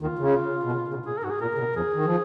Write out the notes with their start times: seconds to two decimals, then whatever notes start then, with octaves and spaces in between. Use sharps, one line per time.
0.01 D#2 D#3 F4
0.19 C#3
0.63 B2
0.72 C#3
0.88 C#3
0.94 B2
1.06 A#2 G#4
1.18 A#4
1.23 G#2 F#4
1.30 G#4
1.41 A#2 A#4
1.54 C#3
1.59 B2
1.76 F2 F3 G#4
1.94 D#3
2.05 F3